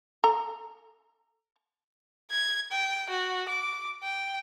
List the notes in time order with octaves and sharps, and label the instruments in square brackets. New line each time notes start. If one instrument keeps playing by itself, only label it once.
[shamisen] A4 A#5
[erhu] G#6
G5
F#4
D6
G5